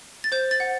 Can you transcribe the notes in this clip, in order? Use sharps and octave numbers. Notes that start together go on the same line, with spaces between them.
A6
C5 G6
A6
F#5